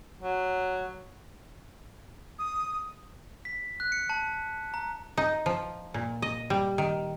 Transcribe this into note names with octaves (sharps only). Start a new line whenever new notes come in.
F#3
D#6
B6
F#6
C#7
A5
A#5
D#4
F3
A#2
D#5
G3
D#3